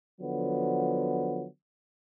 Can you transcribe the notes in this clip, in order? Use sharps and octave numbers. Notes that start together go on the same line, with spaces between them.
D3 F3 F#3 B3